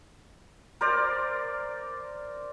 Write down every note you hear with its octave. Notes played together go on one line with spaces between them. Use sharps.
A#4 C5 D5